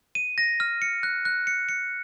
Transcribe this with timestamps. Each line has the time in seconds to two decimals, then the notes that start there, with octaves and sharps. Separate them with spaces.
0.15 D#7
0.38 A#6
0.60 F6
0.82 C#7
1.03 F#6
1.25 F#6
1.47 C#7
1.69 C#7